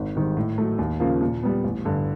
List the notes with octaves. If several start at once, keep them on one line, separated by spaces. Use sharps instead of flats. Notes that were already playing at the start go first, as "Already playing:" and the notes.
Already playing: G#1
G#2 D#3 G3
A2
F#3 A3
D#2
C#3 F3 A#3
A#2
G3 B3
A1
G2 D3